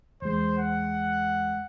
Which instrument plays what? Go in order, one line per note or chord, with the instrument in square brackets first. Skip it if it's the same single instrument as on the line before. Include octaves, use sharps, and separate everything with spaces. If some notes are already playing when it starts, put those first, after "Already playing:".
[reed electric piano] E2 G#3 [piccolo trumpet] C5
[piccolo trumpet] F#5